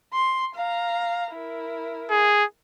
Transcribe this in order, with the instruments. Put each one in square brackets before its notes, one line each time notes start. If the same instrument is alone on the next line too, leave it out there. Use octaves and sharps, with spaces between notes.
[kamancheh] C6
F5 A#5
E4 A#4
[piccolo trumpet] G#4